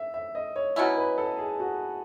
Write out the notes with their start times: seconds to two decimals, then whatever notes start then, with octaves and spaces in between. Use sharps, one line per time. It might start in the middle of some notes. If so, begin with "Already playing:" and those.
Already playing: E5
0.14 E5
0.35 D#5
0.56 C#5
0.76 B2 F#3 C#4 E4 D#5
0.97 B4
1.18 A4
1.38 G#4
1.60 F#4